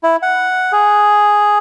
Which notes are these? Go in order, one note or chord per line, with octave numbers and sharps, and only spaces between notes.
E4
F#5
G#4